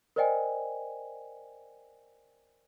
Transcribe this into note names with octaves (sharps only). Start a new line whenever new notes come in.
A#4 C5 D5 D#5 G5 G#5